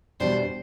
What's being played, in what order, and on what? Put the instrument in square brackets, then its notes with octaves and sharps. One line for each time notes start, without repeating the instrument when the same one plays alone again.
[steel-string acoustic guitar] E2 B2 G3 D4 [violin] C5